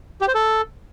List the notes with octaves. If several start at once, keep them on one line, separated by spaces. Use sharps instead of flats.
G4
C5
A4